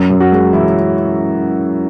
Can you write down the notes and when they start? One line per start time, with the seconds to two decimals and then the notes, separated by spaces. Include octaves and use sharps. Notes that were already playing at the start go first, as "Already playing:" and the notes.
Already playing: F#2
0.10 F#2
0.20 F#4
0.32 G#3
0.53 E3 E4